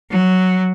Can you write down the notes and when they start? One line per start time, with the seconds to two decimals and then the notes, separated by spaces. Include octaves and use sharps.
0.11 F#3